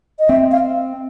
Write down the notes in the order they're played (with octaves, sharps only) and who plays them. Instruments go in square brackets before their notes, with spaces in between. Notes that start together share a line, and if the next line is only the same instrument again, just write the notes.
[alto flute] D#5
[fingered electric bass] C4 [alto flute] E5
[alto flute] F5